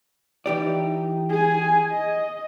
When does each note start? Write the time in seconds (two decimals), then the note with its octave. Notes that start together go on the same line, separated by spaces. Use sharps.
0.46 E3 D#4 G4 D5
1.30 G#4 G#5
1.91 D#5